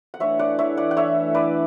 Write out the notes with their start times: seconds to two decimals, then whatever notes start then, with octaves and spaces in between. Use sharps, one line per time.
0.14 F#5
0.20 E3 A3 D4 C#5 E5
0.39 D5 F#5
0.59 C#5 E5
0.77 D5 F#5
0.91 F#5
0.97 C#5 E5
1.34 B4 D5